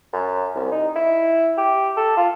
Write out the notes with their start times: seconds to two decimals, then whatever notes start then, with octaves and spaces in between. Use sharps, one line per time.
0.13 F#2
0.55 C2
0.72 D#4
0.96 E4
1.58 G4
1.97 A4
2.17 F4